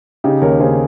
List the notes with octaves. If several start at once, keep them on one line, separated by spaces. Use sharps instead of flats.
C#3 D#4 G4
D#2 A#4 C#5
C#3 G#4 C5